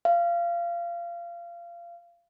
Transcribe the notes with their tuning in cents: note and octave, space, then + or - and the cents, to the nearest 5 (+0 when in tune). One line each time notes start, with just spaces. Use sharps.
F5 -25